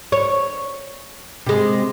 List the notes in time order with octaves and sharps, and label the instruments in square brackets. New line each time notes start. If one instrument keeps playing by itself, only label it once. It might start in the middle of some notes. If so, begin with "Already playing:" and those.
[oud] C#5
C3 G#3